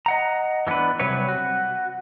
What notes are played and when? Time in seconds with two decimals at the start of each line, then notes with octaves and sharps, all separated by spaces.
0.06 D#5 F#5 A#5
0.67 E3 G#3 B3 D4 B4
0.99 C3 F#3 G3 B4 C#5
1.29 F#4